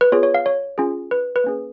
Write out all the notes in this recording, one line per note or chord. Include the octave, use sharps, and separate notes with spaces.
B4
B3 F4 G#4 C#5
C#5
F5
C#5
C#4 F4 G#4
B4
B4
A#3 C#4 G#4